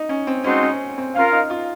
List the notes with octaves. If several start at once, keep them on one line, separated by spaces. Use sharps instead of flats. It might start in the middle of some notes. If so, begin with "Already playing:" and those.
Already playing: D#4
C#4
C4
G#3 C4 C#4 D#4 F#4 C5
C#4
C4
C#4 F4 A#4 F5
D#4
F4